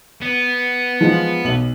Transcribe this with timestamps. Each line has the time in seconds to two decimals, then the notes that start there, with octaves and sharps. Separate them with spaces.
0.21 B3
1.01 F3 G#3 F4
1.44 B1 F#7